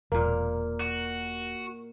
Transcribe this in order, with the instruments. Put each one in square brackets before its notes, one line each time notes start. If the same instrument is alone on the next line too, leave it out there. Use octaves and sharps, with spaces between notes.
[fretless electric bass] E1 [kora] A#2 A#3 [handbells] A#4
[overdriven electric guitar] F#4